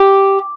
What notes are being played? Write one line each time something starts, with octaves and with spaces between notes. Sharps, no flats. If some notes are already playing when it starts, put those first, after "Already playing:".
Already playing: G4